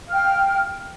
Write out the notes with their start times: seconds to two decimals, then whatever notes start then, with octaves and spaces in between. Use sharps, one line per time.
0.07 F5
0.10 F6
0.12 G5